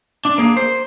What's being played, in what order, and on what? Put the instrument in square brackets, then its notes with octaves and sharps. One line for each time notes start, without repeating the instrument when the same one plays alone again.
[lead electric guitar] D4
A#3 G#4
C5